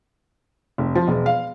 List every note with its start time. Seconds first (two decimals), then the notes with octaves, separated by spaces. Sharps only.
0.78 F1
0.95 F3
1.08 E1
1.26 F5